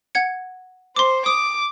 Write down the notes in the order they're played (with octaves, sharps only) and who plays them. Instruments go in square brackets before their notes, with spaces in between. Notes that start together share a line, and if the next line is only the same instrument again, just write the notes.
[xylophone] F#5 G#6 C#7
[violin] C5 [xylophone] C6 D6
[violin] D6 [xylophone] D#6